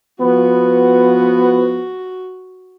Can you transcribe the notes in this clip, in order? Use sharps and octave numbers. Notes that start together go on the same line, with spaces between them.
F3 B3 F#4